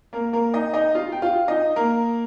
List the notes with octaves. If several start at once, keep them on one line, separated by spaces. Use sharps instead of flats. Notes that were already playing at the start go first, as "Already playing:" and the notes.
A#3 A#4
A#3 A#4
D#4 D#5
D#4 D#5
F4 F5
G5
F4 F5
D#4 D#5
A#3 A#4